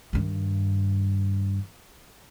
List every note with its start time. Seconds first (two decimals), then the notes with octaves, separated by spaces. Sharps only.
0.13 G2 D#3